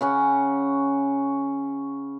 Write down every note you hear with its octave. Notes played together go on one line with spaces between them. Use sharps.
C#3 C#4 F#5